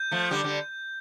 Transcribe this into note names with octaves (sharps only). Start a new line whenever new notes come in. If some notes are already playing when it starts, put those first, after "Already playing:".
Already playing: G6
F3 A3
D3 G3
D3 G3